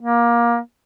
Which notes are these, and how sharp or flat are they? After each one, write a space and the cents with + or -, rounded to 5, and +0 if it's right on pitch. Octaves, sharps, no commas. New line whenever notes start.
A#3 +20